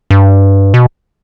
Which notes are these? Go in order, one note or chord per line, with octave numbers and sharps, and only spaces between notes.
G2
B2